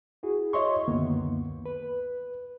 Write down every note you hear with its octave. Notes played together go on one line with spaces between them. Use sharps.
E4 F#4 G#4
C#5 D#5 E5 C6 C#6
C#2 F#2 D3 D#3 A#3 B3
B4